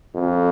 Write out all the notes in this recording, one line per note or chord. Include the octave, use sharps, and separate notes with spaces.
F2